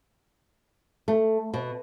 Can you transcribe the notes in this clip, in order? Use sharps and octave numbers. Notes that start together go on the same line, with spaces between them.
A3
B2